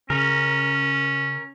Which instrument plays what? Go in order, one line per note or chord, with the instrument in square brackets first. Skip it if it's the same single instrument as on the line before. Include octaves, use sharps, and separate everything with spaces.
[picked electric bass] C#3 [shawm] C#4 [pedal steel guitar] A#4